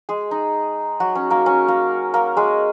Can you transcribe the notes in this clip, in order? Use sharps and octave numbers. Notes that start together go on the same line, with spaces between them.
G#3 G#4
D#4
F#3 F#4
C#4 C#5
A#3 A#4
C#4 C#5
A#3 A#4
A#3 A#4
G#3 G#4